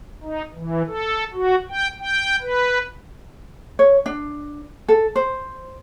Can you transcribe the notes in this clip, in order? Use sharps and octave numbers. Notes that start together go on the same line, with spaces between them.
D#4
E3
A4
F#4
G5
G5
B4
C#5
D4
A4
C5